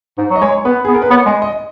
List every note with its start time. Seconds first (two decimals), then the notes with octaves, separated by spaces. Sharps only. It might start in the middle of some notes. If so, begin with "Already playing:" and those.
0.18 G#2
0.30 F#3
0.36 D#5
0.41 G#3 C#5
0.65 B3 B4
0.85 B3 G#4
0.94 A#4
1.02 B4
1.10 B3 C#5
1.26 G#3 D#5
1.42 D#5